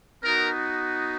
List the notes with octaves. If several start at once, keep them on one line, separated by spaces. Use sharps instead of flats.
B3 D#4 F#4 A#4